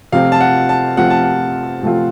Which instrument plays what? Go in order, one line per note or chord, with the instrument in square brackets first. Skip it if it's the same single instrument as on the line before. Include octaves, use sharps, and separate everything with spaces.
[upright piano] C3 F3 A3 C4 F4 [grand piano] F5
[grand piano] A5
F#5
A5
[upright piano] C3 F3 A3 C4 F4 [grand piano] F#5
[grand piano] A5
F#5
[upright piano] C3 F3 A3 C4 F4